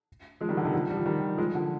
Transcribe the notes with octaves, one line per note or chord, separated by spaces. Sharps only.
F3 G#3
D#3 G3
D3 F3
C3 D#3
D3 F3
G3
F3
D#3 G3
F3 G#3
D3 F3